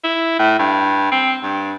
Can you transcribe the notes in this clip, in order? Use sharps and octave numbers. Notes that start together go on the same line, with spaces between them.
E4
A2
G2
C4
G2